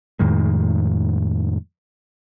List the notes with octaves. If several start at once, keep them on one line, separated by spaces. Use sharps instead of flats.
F2 A2 D#3 G#3